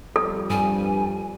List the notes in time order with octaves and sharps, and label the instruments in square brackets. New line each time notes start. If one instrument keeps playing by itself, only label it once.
[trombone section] F2 G3 [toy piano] A4
[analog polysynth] G2 [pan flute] G#5